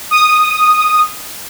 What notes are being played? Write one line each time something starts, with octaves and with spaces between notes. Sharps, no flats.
D#6